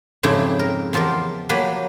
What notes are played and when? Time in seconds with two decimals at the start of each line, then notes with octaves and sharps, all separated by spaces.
0.23 F2 G#2 C#3 E4 G4
0.59 A#4
0.93 E2 F3 F4 G4 A#4
1.49 F3 F#3 A#3 G4 B4